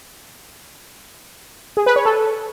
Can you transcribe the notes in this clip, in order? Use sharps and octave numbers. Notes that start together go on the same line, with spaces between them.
G#4
B4
C#5
A4